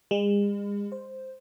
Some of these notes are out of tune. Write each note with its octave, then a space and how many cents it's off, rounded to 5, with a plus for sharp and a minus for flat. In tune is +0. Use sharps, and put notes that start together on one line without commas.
G#3 -40
C5 +0